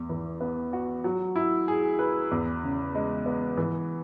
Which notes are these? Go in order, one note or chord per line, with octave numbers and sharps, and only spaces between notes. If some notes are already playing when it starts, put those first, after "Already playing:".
Already playing: E2
E3
B3
F#4
F#3
E4
G#4
B4
E2
C#3
G#3
B3
E3